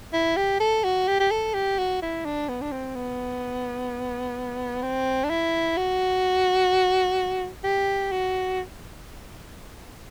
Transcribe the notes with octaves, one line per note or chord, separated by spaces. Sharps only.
E4
G4
A4
F#4
G4
G4
A4
G4
F#4
E4
D4
B3
D4
C4
B3
C4
D4
E4
F#4
G4
F#4